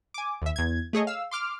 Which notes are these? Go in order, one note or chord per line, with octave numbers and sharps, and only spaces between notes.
G#5 D6
D#2 E5
E2 G#6
A3 G#4 C#5 D#5
F5 E6
C6 D6 F6